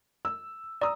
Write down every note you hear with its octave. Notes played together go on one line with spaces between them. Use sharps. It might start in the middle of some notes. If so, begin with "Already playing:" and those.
E6
D5 A#5 D#6 E6